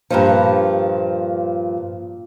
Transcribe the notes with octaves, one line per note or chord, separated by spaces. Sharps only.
G2 A#2 F3